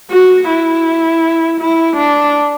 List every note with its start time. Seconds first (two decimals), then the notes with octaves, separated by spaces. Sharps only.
0.11 F#4
0.49 E4
1.61 E4
1.96 D4